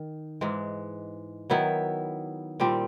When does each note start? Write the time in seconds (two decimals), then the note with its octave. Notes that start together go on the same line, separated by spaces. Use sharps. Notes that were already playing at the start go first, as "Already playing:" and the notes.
Already playing: D#3
0.41 G#2 E3 G#3
1.50 D#3 F#3 B3 E4
2.60 A#2 G3 C4